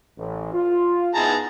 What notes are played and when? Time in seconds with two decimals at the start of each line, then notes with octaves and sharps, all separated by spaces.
0.18 A1
0.53 F4
1.15 B3 D#4 E4 G#4 A5 A#5